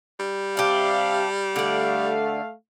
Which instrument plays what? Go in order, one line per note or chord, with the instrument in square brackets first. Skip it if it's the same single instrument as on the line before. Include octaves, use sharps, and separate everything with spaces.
[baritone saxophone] G3
[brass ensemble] C3 E5 F5 [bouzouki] D4 G4
[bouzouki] D3 D5 [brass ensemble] A3 F5